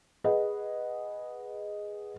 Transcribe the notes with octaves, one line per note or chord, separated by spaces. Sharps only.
G#4 B4 D#5 F#5